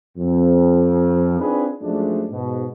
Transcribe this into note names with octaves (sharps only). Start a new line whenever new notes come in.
F2
C4 D4 D#4 F4 G#4 B4
F#2 F3 G#3 A3 D4
G#2 B2